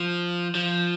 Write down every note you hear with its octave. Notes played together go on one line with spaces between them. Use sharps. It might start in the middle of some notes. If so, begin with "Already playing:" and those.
Already playing: F3
F3